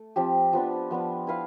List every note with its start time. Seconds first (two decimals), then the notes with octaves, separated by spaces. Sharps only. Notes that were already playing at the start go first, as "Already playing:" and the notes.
Already playing: A3
0.16 F3 C4 G4
0.53 F3 B3 D4
0.91 F3 B3 D4
1.27 E4 B4 F5